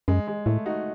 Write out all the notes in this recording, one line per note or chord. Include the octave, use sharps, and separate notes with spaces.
F#2 G#3
G#3
A2 A3
D#4 F#4